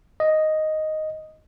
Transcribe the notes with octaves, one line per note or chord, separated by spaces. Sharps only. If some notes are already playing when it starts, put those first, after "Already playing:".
D#5